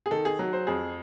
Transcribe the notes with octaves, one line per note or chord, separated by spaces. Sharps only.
G#4
D#3 A4
G#4
F#3
C5
F2 G#4